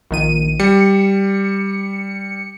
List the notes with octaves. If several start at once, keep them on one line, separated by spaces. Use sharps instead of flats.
A#1 D#3 D#7
G3 C#7